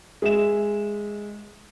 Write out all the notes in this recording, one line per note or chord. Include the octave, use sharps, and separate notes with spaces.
G#3 E5 E7